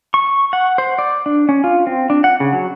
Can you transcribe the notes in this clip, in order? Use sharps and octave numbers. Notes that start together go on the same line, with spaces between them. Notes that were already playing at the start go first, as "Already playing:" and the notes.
C#6
F#5
C5
D5
D4
C#4
F4
C4
D4
F#5
C#3
F#3